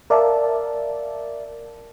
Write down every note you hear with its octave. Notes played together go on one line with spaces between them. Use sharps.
A#4 D5 E5 F5 A5